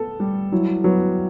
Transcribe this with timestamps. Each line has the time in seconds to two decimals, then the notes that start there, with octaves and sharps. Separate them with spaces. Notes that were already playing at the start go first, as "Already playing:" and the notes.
Already playing: B3 A4
0.20 G3
0.52 F#3 E4
0.84 F#3 B3